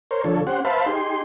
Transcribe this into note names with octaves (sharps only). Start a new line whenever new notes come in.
A#4 C5 C#5
D3 F3 A4 C#5
C#4 G4 C5 F#5
B4 C5 E5 F5 A5 B5
D#4 G4 G#4 C6